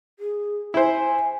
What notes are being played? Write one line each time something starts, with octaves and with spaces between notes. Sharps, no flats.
G#4
E4 C5 G#5